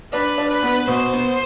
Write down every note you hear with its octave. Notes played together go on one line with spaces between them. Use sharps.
D4 B4
D4
B4
B3
B2 C5
B3